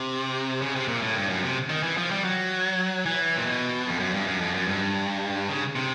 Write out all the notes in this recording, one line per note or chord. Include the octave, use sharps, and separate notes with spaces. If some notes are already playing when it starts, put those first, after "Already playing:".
Already playing: C3
C#3
C3
A#2
A2
G2
F#2
C3
D#3
E3
F3
G3
F#3
E3
A#2
B2
F2
F#2
G2
F#2
F2
F#2
G2
C#3
C3